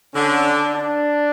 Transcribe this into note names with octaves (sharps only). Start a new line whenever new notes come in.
D3 C#4
D4
D4